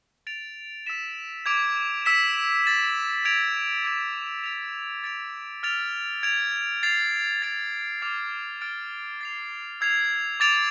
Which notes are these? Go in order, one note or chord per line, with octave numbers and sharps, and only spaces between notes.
A6 D7 F7
E6 B6 E7
D6 G#6 D7 F7
E6 B6 E7
A6 E7
G#6 D7 F7
D6 G#6 D7
A6 D7 F7
A6 D7 F7
F6 A6 D7 F7
G#6 D7 F7
A6 C7 F7
A6 D7 F7
D6 F6 G#6 C7 F7
F6 A6 D7
A6 C7 F7
E6 G#6 C7 F7
D6 A6 D7 F7